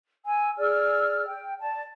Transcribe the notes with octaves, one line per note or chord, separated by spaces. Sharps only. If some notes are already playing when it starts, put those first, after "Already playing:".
G#5 E6
G#4 D5 E6 F6
G5
D5 A5